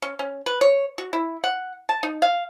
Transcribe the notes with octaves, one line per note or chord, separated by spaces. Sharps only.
C#4
C#4
B4
C#5
F#4
E4
F#5
A5
D#4
F5